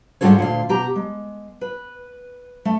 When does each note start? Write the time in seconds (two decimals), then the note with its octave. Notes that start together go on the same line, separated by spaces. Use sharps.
0.21 G#2 F3 G3 F4 A4 C#5
0.39 D2 A#2 F4
0.69 B2 G4 A#5
0.96 G#3
1.61 B4
2.65 A3